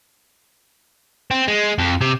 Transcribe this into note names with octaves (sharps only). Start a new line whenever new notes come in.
C4
G#3
F2
C3